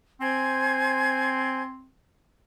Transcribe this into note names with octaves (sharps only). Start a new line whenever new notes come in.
C4 C5 G#5 G#6